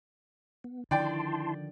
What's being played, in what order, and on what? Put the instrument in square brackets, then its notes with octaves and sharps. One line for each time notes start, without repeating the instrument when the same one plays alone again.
[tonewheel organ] B3
[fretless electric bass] D3 D#3 F3 [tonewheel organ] E4 A5 C6 [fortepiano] D5 G5